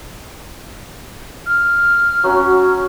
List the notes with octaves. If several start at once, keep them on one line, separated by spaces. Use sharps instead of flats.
F6
F#3 C#4 F#4